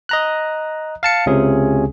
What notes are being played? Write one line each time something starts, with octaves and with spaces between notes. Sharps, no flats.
D#5 A#5 F#6
F5 A5 C#7
C#2 C3 C#4 G#4